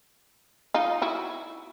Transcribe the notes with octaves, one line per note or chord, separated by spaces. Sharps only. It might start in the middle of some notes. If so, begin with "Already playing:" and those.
D#4 F4
E4 F#4